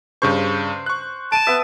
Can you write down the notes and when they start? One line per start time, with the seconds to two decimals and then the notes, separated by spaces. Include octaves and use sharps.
0.22 G2 C#3 C5 C#6
0.86 C#6 F#6
1.32 A5 D7 D#7
1.47 B3 E5